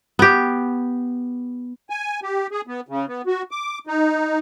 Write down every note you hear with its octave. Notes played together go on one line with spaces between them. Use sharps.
B3 G4
G#5
G4
G#4
B3
C#3
B3
F#4
D6
D#4